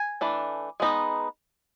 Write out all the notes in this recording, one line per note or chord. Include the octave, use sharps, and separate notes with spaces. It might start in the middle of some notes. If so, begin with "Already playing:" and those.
Already playing: G#5
E3 A3 D4
G#3 B3 D#4